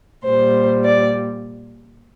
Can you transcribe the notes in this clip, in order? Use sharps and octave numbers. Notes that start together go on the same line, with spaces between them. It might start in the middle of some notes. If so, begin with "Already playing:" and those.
A#2 G3 C5
D5